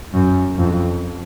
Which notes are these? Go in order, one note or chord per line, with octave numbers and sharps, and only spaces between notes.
F#2
F2